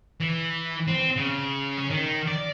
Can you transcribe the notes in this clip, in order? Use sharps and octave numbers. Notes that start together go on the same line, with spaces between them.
E3
C4
C#3
C#4
D#3
D5